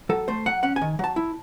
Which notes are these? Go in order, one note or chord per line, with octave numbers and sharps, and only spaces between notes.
F#3 A4
A3 C5
F#3 F#5
C#4 F#5
G#5
D#3
F#3 A5
E4